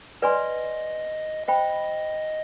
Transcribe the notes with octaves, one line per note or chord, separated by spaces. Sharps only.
B4 D5 D#5 G#5 C6
C5 D#5 G5 B5